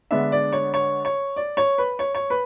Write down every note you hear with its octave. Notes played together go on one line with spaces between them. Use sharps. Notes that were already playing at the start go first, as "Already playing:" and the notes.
D3 G#3 B3 D4 E5
D5
C#5
C#5
C#5
D5
C#5
B4
C#5
C#5
B4